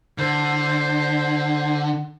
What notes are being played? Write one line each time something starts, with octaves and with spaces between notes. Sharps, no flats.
D3 C5